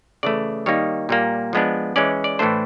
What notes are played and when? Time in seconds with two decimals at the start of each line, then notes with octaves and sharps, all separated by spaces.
0.23 C#3 E3 A3 D5
0.66 D#3 G3 A#3 D#4 C#5
1.09 A#2 G3 A#3
1.53 F3 G#3 B3 D4
1.96 E3 G#3 C#4 D5
2.24 D5
2.39 A2 E3 A3 D4 C5